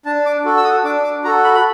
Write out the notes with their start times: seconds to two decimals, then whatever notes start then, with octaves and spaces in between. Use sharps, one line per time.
0.05 D4 A5
0.26 D6
0.45 F#4 A4
0.57 E6
0.64 D#6
0.84 D4 D6
1.04 D6
1.24 F#4 A4 A#5
1.44 B5
1.55 B5